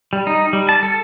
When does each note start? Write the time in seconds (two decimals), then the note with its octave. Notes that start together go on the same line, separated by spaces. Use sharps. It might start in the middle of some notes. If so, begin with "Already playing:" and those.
0.13 G3
0.27 D#4
0.53 G3
0.69 A5
0.83 A4